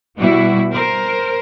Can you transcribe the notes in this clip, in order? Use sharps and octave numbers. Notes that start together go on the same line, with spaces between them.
B2 G3 B3 E4 F#4
A#4 C5